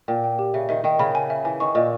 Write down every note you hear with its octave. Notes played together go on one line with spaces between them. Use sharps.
A#2 G5
G5
G4
C#3 E5
D#3 E5
D#3 G5
C#3 B5
G#5
E5
E3 G#5
D#3 C#6
A#2 D#5